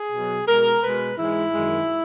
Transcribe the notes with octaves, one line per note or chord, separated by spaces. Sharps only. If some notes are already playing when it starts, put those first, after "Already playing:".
Already playing: G#4
B2
F#3
B2 G#3 A#4
B2 G#3 B4
G#2 E3 G#3 E4
F#2 D#3 G#3